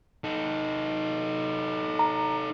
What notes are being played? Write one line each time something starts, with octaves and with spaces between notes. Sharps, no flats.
D#4 A4
A#5